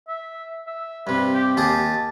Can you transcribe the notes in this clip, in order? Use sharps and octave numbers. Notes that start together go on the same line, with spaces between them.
E5
E5
G2 C3 B4
G4
D#2 G4 G#4 A5